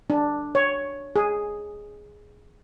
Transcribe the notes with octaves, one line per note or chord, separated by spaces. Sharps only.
D4
C#5
G#4